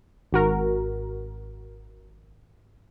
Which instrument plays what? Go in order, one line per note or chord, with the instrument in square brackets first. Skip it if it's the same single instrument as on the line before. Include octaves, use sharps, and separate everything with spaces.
[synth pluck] G#1 F#4 A#4